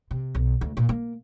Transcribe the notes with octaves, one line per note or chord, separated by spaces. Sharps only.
C3
B1
D2
A#2
A#3